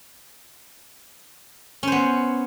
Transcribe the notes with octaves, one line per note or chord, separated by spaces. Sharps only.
B3 C#4 C5